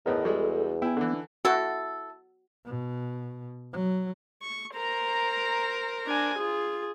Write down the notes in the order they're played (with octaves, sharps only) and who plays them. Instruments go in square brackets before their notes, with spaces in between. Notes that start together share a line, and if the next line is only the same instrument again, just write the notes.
[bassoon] E2 [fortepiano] A2 B3 D#4 [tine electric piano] A#4 D#5
[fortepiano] G3 G#3 [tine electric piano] F#4 [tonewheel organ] A4
[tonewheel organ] B3 [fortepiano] E4 [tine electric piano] G5 G#5
[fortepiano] D3 E3 [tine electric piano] D4 E4
[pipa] E4 A4 [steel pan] F#4
[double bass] B2
F#3
[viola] C#6
[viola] A#4 C5 [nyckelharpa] A#5
[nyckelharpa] D4 G#5
[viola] F4 [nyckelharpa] G#4